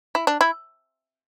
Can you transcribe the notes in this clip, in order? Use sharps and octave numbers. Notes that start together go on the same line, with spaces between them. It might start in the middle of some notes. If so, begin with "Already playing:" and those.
E4
D4
E4